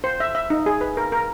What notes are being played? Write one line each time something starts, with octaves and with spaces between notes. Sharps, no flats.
C5
E5
E5
D#4
G#4
B4
A#4
A#4